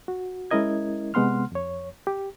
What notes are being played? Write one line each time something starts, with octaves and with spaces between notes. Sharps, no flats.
F#4
G#3 C#4 E4 A#4 D#5 G#6
C3 G#3 B3 F#5 C6 F6
F2 C#5
G4